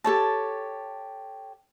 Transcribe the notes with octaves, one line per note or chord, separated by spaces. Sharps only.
G4 A4 C#5 A5